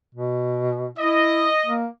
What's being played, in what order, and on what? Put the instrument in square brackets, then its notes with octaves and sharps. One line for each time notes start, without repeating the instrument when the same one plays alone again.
[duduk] B2
[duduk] E4 [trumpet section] D#5
[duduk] A#3